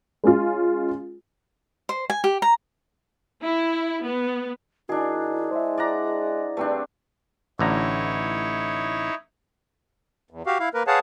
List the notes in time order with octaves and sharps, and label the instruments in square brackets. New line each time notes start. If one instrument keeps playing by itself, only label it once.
[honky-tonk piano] G#3 C#4 F4
[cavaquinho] C5
G#5
G4
A#5
[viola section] E4
B3
[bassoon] D#3 [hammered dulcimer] D4 G#4 [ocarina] E4 [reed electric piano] F#4
[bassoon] G#3 [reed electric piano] C5 E5
[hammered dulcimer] D5 F#5 A#5
[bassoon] G2 [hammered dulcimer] A3 C4 D4
[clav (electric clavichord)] A1 D3 A#5 [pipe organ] D#4 E4 C#5
[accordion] E2
F#4 G4 F5
E4 F5
A#3 A#4 B4
G#4 B4 C#5 F5 F#5 A5